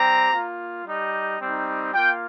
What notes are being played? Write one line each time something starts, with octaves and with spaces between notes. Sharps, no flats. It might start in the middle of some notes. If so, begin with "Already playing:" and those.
Already playing: G3 C4 G4 A#5
A#3 F4
G3 D#4 G4
G3 C4 D#4
A#3 F4 G5